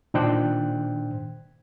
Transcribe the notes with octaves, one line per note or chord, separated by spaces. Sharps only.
A#2 D#3 D4 C5 G5 F#6